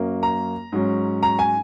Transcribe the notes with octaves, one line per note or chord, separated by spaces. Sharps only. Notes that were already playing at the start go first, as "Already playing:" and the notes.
Already playing: F#2 F#3 A#3 C#4
A#5
G#2 F#3 C#4
A#5
G#5